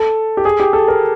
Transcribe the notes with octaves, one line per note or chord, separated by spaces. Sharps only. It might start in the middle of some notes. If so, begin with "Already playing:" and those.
Already playing: A4
G4
G#4
G4
A4
A#4